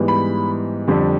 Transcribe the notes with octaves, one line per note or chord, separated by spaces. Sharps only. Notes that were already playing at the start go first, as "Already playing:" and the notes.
Already playing: G#2 E3 G3 B3
B5
F2 D3 G3